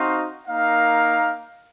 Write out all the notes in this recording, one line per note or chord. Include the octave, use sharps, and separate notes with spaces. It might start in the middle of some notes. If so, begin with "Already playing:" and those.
Already playing: C4 D#4 F#4 C5 F5
A#3 D#4 A#4 F5